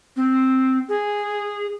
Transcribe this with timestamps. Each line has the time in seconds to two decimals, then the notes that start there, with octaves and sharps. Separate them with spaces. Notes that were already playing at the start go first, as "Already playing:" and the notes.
0.16 C4
0.89 G#4